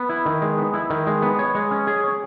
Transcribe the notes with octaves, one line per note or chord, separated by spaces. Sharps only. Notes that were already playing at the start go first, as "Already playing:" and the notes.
Already playing: B3
E4
D#3
G#3
B3
E4
D#3
G#3
B3
C#5
G#3
C#4
G#4
C#5